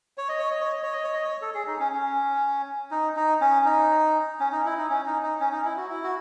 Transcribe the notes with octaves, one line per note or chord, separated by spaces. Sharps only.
C#5
D#5
C#5
D#5
C#5
D#5
C#5
D#5
C#5
D#5
C#5
A4
G#4
D#4
C#4
C#4
D#4
D#4
C#4
D#4
C#4
D#4
E4
D#4
C#4
D#4
D#4
C#4
D#4
E4
F#4
E4
F#4